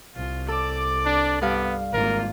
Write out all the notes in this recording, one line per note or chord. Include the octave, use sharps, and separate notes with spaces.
C2 F4
A4 D5 D6
D4
G2 B3 F5
G#1 A#3 F4 A#4